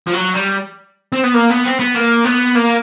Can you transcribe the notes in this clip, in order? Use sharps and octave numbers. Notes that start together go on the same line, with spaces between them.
F3
F#3
G3
C4
B3
A#3
B3
C4
B3
A#3
B3
A#3